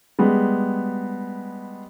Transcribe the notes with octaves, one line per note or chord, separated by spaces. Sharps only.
G3 G#3 B3